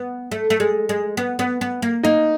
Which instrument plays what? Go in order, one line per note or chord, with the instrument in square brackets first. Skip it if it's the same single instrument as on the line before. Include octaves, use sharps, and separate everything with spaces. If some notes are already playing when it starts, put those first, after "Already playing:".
Already playing: [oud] B3
A3
A3
G#3
G#3
B3
B3
B3
A#3
[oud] A#3 [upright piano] D#4